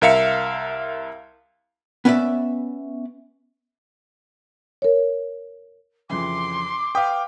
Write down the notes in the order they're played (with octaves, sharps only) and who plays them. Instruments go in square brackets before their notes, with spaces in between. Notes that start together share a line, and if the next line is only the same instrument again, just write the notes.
[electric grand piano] C2 A#4 E5 F5 C#7
[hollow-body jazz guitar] B3 C#4 B4 D5 E5
[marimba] A#4 C#5
[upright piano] F2 C#3 E3 [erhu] C6 [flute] D6
[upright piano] B4 D#6 B6 [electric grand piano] F5 G5